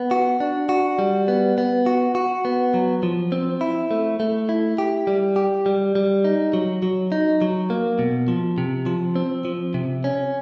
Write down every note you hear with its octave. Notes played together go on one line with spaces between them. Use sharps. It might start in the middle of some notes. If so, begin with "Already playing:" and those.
Already playing: B3
F#4
D4
F#4
G3
B3
B3
F#4
F#4
B3
F#3
F3
C4
E4
A3
A3
E4
G4
G3
G4
G3
G3
D#4
F#3
F#3
D#4
F#3
A#3
B2
F3
C3
F3
C4
F3
C3
C#4